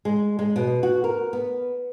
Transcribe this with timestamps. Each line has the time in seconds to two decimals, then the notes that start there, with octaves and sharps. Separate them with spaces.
0.05 G#3
0.39 G#3
0.56 B2
0.83 F#4
1.04 A#4
1.33 B3